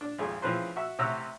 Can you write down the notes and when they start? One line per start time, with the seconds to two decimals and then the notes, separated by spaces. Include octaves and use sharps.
0.01 D4
0.18 G#1 F2 G#4
0.42 C#3 E3 F3 C4 B4 C5
0.76 F#4 E5
0.99 A1 C3 F#5 A#5 C#6 E6